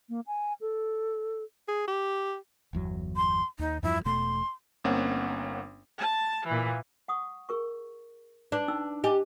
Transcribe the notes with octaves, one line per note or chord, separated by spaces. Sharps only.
A#3
G#5
A4
G#4
G4
G1 E2 F#3
C6
D#2 D#4
E2 G2 F3 E4
E1 B2 A3 C6
G1 A#3 C4 C#4 F#5
A5
A#2 E3
F#5 C#6 D#6
G#4 A#4 C#6
D4 B4 D5
C#4 D#4 E6
G4 D#5 G#5 A5